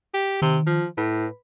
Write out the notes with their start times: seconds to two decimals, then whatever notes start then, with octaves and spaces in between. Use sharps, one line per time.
0.14 G4
0.42 C3 D#3
0.67 F3
0.98 A2 B4